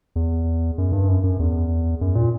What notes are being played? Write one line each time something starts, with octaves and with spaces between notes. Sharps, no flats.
E2
F#2
G2
F#2
F#2
E2
F#2
A#2